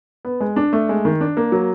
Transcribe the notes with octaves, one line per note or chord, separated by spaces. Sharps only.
B3
G#3
D4
A3
G#3
D#3
D4
A#3
F#3